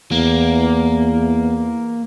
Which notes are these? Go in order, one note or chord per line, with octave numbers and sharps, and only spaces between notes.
E2 A#3